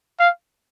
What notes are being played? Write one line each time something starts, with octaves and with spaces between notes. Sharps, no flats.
F5